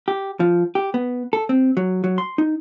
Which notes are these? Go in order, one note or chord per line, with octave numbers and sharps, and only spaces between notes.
G4
F3
G4
B3
A4
C4
F#3
F#3
C6
D#4